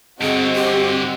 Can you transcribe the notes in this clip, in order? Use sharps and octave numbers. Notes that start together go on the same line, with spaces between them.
G2 D3 C4 F#4 G#4 D#5
G4